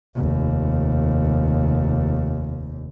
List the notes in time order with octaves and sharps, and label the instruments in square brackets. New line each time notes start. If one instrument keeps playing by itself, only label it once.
[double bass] F1 D#2